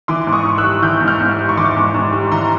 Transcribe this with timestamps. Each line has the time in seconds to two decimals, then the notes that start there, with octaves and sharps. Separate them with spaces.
0.08 E3 C6 D6
0.27 G#2
0.33 C#6 D#6
0.45 G#2
0.58 E6 F#6
0.64 G3
0.82 E3 F6 G6
1.01 G#2
1.08 F6 G6
1.20 G#2
1.38 G3
1.49 C#6
1.57 E3 C6 D6
1.76 G#2
1.94 G#2
2.13 G3
2.32 E3 A#5 C6